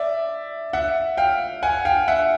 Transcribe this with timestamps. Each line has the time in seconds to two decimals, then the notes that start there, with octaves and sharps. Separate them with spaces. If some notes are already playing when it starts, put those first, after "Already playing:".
Already playing: D5 E5
0.73 E5 F#5
1.17 F5 G5
1.63 F#5 G#5
1.85 F5 G5
2.08 E5 F#5